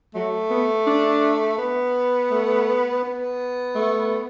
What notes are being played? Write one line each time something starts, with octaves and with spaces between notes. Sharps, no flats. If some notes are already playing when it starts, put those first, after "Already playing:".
F#3 A3
B3
D4
B3
A3
B3
A3